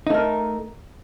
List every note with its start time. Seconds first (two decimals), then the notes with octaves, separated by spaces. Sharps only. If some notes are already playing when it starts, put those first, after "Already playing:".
0.07 D#4
0.10 A3
0.14 A#4